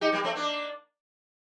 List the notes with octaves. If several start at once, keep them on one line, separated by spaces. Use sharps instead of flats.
D#4 G4
G3 A#3
A3 C4
A#3 D4